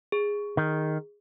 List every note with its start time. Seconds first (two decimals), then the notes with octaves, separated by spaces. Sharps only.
0.12 G#4
0.57 D#3